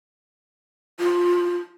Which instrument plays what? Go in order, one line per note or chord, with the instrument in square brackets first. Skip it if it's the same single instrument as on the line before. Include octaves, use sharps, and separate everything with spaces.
[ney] F4